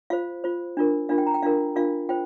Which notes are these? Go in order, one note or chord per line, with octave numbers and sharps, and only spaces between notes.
F4 C5 F5
F4 C5
D4 F4 A#4
D4 F4 A#4 F5
G5
A#5
G5
D4 F4 A#4 F5
D4 F4 A#4 F5
F4 C5 G5